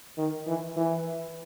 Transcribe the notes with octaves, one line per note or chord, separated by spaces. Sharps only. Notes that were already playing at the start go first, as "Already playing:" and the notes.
D#3
E3
E3